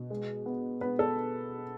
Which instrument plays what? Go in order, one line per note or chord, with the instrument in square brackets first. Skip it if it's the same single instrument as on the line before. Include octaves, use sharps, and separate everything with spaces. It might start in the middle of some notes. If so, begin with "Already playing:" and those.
Already playing: [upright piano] B2
G#3
B3
B3 B4
A4